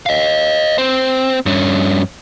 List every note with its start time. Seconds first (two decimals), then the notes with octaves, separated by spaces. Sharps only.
0.06 D#5 F5
0.78 C4
1.46 G2 C#4